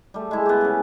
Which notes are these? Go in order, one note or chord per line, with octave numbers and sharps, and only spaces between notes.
G3 A3
G#3 E4
B3 G4
C#3 C#4